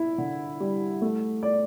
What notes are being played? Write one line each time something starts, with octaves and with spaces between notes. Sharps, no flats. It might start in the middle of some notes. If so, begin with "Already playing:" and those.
Already playing: E4
D3
G3
A3
D5